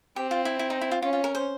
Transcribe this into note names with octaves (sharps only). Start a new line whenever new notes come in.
C4 G4
F4
E4
E4
D#4
E4
F4
C#4 F4
F4
A#4
C5